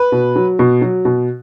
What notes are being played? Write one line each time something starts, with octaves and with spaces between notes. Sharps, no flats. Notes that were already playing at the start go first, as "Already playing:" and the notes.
Already playing: B4
B2
F#3
B2
F#3
B2